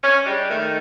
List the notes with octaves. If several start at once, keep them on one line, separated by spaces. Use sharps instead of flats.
C#4
G3 G#3 D4 G4
D#3 A3